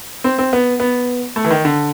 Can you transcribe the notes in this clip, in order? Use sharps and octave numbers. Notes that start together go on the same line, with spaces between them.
C4
C4
B3
B3
A3
E3
D#3
D3